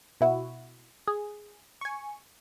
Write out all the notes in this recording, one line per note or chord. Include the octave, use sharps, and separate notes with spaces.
B2 E4 F#4
G#4
G#5 C#6